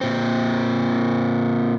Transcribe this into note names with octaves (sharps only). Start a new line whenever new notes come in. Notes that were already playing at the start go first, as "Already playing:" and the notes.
A#2 C4